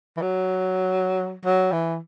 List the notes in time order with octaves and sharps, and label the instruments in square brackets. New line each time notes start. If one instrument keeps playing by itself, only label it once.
[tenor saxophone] E3
F#3
F#3
E3